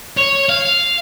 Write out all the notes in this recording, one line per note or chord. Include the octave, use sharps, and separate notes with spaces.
C#5
F5